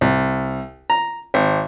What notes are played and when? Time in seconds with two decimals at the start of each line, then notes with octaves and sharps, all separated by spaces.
0.01 C2
0.90 A#5
1.34 G#1